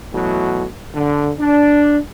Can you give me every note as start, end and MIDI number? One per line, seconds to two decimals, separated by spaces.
0.12 0.65 47
0.12 0.65 52
0.12 0.65 54
0.12 0.65 57
0.94 1.31 50
1.39 1.98 62